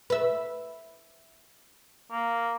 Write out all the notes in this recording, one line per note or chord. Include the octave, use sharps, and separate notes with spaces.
B4 E5
A#3